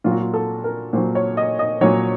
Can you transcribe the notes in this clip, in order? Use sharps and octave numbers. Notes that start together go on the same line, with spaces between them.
A#2 F#3 F4
F#4
F4
A4
A#4
A#2 F#3 C5
C#5
D#5
D#5
A#2 F#3 C#5